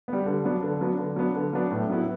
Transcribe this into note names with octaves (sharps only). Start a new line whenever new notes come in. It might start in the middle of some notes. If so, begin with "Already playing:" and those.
G3 B3
D3
F#3 B3 D4
D3
F#3 B3 D4
D3
F#3 B3 D4
D3
F#3 B3 D4
A2
F#3 B3 E4